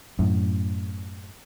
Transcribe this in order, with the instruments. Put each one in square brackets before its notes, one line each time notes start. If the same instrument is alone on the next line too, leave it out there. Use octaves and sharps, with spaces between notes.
[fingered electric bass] F#2 A2